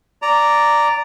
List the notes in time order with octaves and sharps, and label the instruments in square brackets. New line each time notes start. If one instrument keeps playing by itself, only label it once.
[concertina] D5 A#5